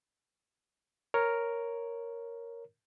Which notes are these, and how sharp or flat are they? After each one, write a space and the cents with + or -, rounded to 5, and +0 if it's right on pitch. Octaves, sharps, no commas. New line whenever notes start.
A#4 +0 C#5 +0